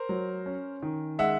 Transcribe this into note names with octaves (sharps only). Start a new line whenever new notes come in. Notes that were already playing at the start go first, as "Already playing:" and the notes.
Already playing: A#4 C5
F#3
C#4
D#3
G#3 E5 F#5